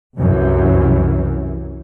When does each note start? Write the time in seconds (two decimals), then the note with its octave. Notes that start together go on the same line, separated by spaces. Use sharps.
0.18 C2 F#2 E3